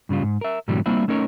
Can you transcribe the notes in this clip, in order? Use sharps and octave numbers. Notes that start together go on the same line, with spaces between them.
G2 C#3 G3 F4
G#2
A#4 E5
G#2 B2 D3 E3 F#3 G3
G3 A#3 C4 D4 E4 F4
A3 C#4 D#4 A#4 B4 C#5